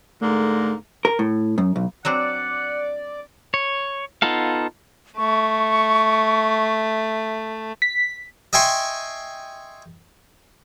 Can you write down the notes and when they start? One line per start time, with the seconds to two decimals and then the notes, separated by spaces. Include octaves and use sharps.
0.22 G#2 D3 A3 A#3
1.05 A#4
1.19 A2
1.58 F#2
1.76 B1
2.05 F#3 C4 D4 D5 F#5
3.54 C#5
4.22 B3 D#4 F4 A4 F5
5.17 A3 C#6
7.82 B6
8.53 D#5 E5 G5 G#5 C6 C#6